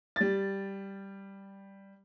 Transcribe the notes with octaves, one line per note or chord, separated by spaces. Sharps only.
G3 A6